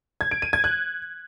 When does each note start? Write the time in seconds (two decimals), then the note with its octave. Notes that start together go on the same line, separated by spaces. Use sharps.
0.21 G#6
0.31 D7
0.42 D#7
0.53 G#6
0.64 F#6